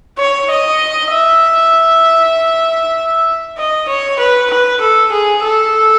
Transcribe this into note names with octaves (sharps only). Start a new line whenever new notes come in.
C#5
D#5
E5
D#5
C#5
B4
B4
A4
G#4
A4